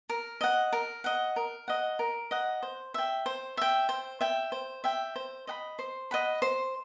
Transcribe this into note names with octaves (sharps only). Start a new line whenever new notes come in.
A#4
D#5 F#5
A#4
D#5 F#5
A#4
D#5 F#5
A#4
D#5 F#5
C5
E5 G5
C5
E5 G5
C5
E5 G5
C5
E5 G5
C5
D#5 F#5 B5
C5
D#5 F#5 B5
C5